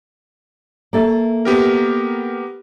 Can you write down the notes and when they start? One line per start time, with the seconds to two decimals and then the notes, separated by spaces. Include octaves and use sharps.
0.93 A#3 A4 E5
1.45 B3 G4 A#4